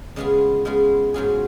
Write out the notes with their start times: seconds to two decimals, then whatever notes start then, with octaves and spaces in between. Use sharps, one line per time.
0.16 C#3 G#3 B3 F4 G#4
0.65 C#3 G#3 B3 F4 G#4
1.14 G#2 F#3 C#4 F4 G#4